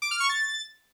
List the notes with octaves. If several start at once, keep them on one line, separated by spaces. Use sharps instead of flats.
D6
F6
C#6
A6